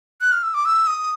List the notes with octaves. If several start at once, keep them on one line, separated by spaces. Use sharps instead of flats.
F#6
F6
E6
D6
E6
D#6